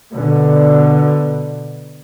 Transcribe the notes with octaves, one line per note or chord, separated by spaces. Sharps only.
B2 D3